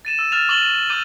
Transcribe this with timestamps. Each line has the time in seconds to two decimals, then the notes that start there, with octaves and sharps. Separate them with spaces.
0.05 A6 D#7 E7
0.19 E6
0.32 F6 A6 E7 F7
0.49 C#6 D6 A6 E7 F#7 G7
0.90 D6 E6 G6 D#7